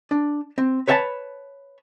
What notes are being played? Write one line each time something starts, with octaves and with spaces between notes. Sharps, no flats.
D4
C4
B4 C#5 E5 G#5 A5 B5